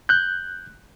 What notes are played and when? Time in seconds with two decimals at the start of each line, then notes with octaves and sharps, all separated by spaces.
0.09 F#6 G6